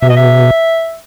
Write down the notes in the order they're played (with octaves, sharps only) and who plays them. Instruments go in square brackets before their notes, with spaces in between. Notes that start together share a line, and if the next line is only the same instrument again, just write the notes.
[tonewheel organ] B2 [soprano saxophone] E5
[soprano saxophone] D#5
E5